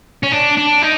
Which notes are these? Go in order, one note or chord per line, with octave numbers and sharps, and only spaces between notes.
C#4
D4
D4
D#4